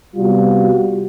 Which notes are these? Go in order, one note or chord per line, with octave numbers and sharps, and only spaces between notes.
C3 G3 B3 F4 F#4